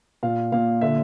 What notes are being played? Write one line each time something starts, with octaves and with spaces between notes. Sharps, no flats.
A#2 F5
A#2 F5
D3 E5